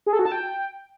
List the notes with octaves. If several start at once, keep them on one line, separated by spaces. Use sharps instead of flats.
G#4
A4
F#4
A5
G5